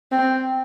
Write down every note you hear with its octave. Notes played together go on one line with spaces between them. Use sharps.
C4